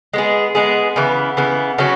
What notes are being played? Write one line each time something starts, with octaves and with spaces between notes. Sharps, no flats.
G#3 B3 G#4
G#3 B3 G#4
C#3 E3 B3
C#3 E3 B3
C#3 F#3 C#4 F#4